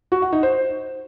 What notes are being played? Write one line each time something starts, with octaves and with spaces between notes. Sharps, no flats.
F#4
F#5
D#4
C5